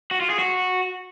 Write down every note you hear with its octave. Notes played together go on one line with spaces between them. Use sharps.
F#4
F4
G#4
F#4